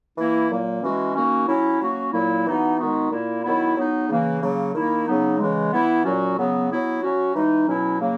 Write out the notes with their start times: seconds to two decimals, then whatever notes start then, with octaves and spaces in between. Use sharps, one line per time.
0.17 E3 A#3 E4
0.49 A#2 F#3 A#3
0.82 E3 G#3 C#4 F#4
1.14 D#3 A#3 C#4 F#4
1.47 F#3 C#4 E4
1.80 F#3 A#3 C#4 F#4
2.12 A#2 F#3 A#3 E4
2.45 E3 B3 D#4 F#4
2.78 D#3 G#3 B3 D#4 F#4
3.10 A#2 A#3 E4
3.43 D#3 F#3 B3 E4
3.75 F#3 B3 D#4
4.08 C#3 E3 A#3
4.41 C#3 F#3 A#3
4.74 D#3 A#3 E4
5.06 C#3 F#3 B3 D#4
5.39 C#3 E3 G#3
5.72 E3 B3 E4
6.04 A#2 F#3 C#4 F#4
6.37 C#3 F#3 B3
6.69 F#3 B3 E4
7.02 F#3 C#4 F#4
7.34 E3 G#3 D#4
7.67 B2 F#3 C#4 E4
8.00 C#3 F#3 A#3